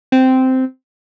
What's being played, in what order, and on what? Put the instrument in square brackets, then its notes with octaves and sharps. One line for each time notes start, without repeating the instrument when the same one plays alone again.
[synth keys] C4